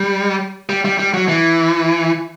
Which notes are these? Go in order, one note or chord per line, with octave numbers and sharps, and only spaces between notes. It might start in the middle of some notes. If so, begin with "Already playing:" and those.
Already playing: G3
G3
G3
G3
F#3
E3